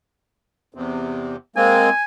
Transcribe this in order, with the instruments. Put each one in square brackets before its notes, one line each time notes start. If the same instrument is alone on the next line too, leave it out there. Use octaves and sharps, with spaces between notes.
[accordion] E2 C3
[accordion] G#3 A#3 C4 [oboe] G#5